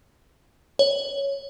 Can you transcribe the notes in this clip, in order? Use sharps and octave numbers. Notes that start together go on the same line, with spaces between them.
C#5